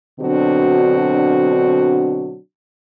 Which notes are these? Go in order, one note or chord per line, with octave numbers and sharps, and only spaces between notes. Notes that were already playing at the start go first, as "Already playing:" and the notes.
B2 D3 F#3 C4 D4 F#4